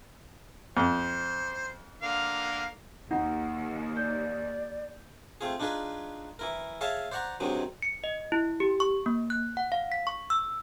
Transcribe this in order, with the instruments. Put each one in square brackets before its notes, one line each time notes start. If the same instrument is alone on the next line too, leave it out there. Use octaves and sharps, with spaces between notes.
[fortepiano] F2 [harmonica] C5
[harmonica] D3 A#3 F5
[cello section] D#2 [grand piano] D#4 [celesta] F#5
[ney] D5 [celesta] G6
[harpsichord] A3 C4 F4 G#4
D4 D#4 F4 G#4 B4
E3 E4 A#4
G#4 C#5 E5 F5 G#5 A5
C5 D5 F#5 A#5 C#6
C2 G2 C3 D#3 F#3 G#3
[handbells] C#7
D#5
E4
G4
C#6
A#3
F#6
F#5
F5
B6
C#6
E6